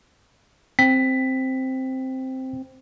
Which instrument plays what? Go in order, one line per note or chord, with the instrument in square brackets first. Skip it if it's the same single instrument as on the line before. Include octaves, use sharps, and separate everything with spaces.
[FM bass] C4 [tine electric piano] B6